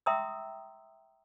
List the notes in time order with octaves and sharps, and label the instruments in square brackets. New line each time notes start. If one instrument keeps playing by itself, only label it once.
[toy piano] E5 G5 A#5 C6 D#6 E6